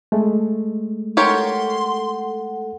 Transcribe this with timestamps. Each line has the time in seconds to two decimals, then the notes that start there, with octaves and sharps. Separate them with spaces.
0.12 G#3 A3
1.17 G4 A4 A#4 C#5 F#5 C6